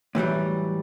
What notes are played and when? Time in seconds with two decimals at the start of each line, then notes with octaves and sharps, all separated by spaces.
0.15 A2 E3 F#3 G3